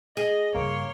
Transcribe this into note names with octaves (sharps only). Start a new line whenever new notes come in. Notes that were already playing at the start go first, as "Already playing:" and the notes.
G#4 D#5
G2 C#3 A#3 C#5 C6